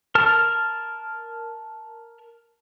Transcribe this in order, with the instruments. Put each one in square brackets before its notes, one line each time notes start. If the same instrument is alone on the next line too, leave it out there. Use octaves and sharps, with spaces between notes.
[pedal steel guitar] A#4 A5 F6